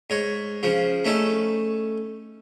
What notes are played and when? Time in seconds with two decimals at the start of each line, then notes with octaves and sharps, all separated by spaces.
0.10 G#2 C#5
0.63 C#3 F3
1.05 A3 C#4 D#4 A4